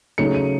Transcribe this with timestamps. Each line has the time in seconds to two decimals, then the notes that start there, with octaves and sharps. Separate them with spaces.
0.18 C#3 F#3 A3 D#4 C#7
0.35 D#7